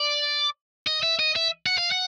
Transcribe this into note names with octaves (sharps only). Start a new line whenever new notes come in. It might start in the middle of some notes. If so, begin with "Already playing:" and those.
Already playing: D5
D#5
E5
D#5
E5
F#5
F5
F#5